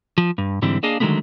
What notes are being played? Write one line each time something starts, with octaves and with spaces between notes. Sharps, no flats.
F3
G2
G#2 D3 E3 G3 C4
A#3 D4 G#4 D#5 F5
D3 D#3 F#3 G#3 A3 B3